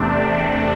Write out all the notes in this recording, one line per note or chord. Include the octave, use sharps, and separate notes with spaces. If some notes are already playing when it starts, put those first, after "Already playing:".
Already playing: E2 C3 A3 C4 D4